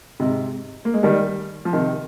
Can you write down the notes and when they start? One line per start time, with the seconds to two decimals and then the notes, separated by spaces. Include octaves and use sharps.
0.20 G#2 C3
0.85 A#3
0.94 G#3
1.03 D#3 G3
1.65 F3
1.73 C3 D#3